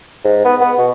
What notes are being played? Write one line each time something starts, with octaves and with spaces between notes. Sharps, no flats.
G#2
B3
B3
B2